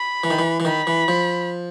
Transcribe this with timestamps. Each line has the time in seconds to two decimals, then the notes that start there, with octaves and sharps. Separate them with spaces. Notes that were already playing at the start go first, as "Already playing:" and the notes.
Already playing: B5
0.24 E3
0.30 D#3
0.39 E3
0.60 E3
0.65 D#3 B5
0.87 E3
1.08 F3